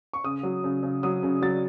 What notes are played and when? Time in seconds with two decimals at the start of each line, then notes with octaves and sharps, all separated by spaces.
0.13 C#6
0.24 C#3 D#6
0.43 F#3
0.64 C#3
0.83 C#3
1.03 F#3 D#6
1.23 C#3
1.42 F#3 A6